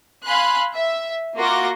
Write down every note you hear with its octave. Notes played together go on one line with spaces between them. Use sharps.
F5 G#5 B5 C6 F#6
E5
A#3 F4 F#4 C6 D6 A#6